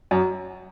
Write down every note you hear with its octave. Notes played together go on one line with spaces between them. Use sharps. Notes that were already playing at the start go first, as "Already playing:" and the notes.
F#2